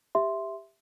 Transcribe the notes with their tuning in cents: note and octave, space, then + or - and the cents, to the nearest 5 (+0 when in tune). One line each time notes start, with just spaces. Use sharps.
G4 +10 E5 +0 C6 +0